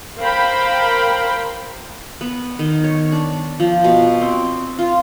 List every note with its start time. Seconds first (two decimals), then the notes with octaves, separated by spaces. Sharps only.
0.19 A#4 C5 F5 G5 B5
2.21 B3
2.59 D#3
2.84 C#5
3.12 D4
3.60 F3
3.84 B2
4.21 C4
4.79 F4